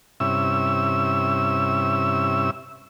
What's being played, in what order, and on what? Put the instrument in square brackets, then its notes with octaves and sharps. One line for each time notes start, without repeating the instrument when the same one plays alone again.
[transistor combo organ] G2 C3 C#4 E4 E5 E6